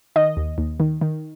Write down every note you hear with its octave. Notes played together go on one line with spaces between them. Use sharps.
D#3 D#5
D#2
D#2
D#3
D#3